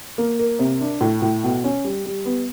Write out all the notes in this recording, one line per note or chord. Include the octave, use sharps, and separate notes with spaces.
A#3
A#4
C3
D4
A2
A2
B2
C#4
G3
G3
B3